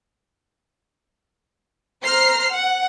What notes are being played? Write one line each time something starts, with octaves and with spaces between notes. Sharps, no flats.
C5 A#5 F6 C7
F#5